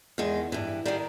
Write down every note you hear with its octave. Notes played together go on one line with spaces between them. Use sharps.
E2 D#3 G#3
G2 E3
D#3 G3 A#3